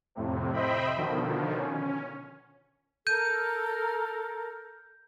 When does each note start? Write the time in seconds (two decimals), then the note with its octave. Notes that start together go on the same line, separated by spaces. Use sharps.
0.15 F2 A2 C3
0.53 C5 D#5 E5 G5 B5
0.96 B2 D3 D#3 F3
1.56 C#4
3.07 A4 A#4 G6 D#7